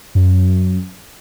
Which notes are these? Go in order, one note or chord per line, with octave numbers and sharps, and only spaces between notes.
F#2